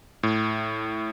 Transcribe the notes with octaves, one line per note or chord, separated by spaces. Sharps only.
A2